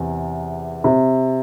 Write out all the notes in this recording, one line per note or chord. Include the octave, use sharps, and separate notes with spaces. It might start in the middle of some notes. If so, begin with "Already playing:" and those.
Already playing: E2 C3
C3